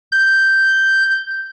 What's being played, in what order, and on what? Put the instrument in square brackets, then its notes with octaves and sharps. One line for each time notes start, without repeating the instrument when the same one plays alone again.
[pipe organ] G6